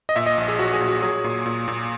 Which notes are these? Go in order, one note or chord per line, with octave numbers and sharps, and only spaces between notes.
D#5
A#2 E5
D#5
A#1
G#4
F#3 F#4
G#4
A#2
F#4
F#3 G#4
A#2
A#2
A#2